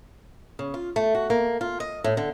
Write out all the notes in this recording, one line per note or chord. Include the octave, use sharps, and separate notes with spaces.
C#3
F4
A3
F#4
A#3
F4
D#5
A2
D3